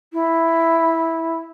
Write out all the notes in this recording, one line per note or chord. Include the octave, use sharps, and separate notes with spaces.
E4